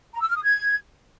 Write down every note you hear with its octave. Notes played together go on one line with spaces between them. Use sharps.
A#5
E6
F6
D#6
G#6